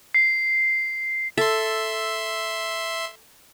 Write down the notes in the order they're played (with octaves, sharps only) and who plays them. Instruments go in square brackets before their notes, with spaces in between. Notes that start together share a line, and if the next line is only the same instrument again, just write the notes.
[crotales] C7
[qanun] A4 [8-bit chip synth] E5 C6